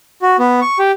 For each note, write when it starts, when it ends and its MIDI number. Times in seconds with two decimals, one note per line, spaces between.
0.22 0.37 66
0.39 0.60 59
0.61 0.78 85
0.79 0.92 67